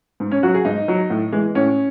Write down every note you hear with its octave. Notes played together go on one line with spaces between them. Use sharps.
G#2
C#4
F#3 F#4
G#4
G#2 D#4
F#3
A2
E3 G#3
A2 C#4